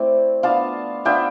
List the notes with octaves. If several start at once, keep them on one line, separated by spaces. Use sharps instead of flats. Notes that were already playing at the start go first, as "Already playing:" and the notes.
Already playing: A3 C4 E4 D5
B3 D4 F4 F5 A5
B3 D4 F4 E5 G5